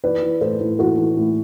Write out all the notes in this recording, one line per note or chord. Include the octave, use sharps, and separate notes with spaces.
E3 B4 D5
E3
A2 A4 C5
A2
E3 F#4 A4
E3
A2